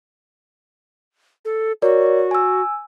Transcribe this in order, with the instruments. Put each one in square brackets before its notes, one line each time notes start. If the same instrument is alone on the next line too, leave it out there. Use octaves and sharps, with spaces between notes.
[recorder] A4
[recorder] F#4 [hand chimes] A#4 C#5 D5
[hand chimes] G#5 E6